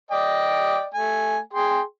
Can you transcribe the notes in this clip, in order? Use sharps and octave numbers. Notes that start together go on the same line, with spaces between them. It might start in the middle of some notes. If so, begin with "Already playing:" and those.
D5 D#5 G5
A3 G#5
G#4 G5 C6